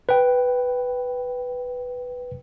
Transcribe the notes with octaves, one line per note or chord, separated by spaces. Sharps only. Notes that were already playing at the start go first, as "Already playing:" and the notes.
B4 G5